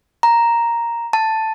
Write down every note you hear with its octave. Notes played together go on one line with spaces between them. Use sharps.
A#5
A5